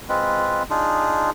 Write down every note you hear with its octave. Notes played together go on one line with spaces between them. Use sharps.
G#3 C4 F4 B4
D4 D#4 F4 G#4